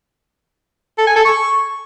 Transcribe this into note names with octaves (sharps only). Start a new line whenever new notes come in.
A4
G#5
A4
C#6